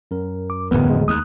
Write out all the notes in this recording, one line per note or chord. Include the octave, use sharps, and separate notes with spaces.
F#2 A#4
D6
D1 E2 B3
D2 C#3 G#3
D#2 D#6 F#6